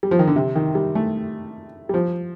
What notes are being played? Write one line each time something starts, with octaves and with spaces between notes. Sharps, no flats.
G3
F3
D#3
D3
C3
D#3
G3
A3
G3
F3